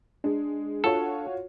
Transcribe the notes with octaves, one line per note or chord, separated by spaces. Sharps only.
G#3 D4
F4 F#4 A4 C#5